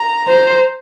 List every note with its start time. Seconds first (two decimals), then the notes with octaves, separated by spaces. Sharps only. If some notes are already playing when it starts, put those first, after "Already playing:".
Already playing: A#5
0.28 C5